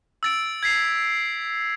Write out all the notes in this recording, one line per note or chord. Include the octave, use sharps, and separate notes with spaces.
E6 A6 D7
G#6 B6 C7 F7